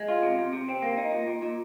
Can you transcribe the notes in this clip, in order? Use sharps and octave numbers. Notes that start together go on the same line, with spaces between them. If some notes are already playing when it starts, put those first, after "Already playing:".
Already playing: G#3
F4
C3
C3
C3
C4
A#3
D#4
A#2
A#2
A#2